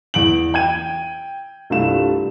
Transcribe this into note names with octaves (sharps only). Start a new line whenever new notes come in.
E2 D7 F#7
G5 G#6 D#7
C2 G2 A3 D4 F4 E7